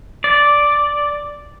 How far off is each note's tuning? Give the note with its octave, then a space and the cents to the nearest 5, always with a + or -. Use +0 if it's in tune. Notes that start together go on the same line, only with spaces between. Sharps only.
D5 -5